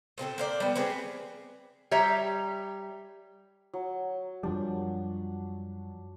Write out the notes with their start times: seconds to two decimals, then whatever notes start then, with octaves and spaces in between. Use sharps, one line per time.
0.18 A#2 C4 G#4 A4
0.38 A#3 C5 D5
0.60 G3 B3
0.76 B3 C4 G4 G#4
1.91 G3 C#5 E5 A#5
3.74 F#3
4.43 F#2 F3 G3 D4